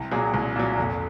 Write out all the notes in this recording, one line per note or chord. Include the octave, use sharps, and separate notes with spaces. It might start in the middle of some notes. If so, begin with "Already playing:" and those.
Already playing: C2
A#2 F#3 G#4
C2
A#2 F#3
F1